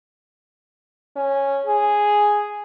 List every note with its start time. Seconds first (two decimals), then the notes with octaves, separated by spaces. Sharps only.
1.16 C#4
1.66 G#4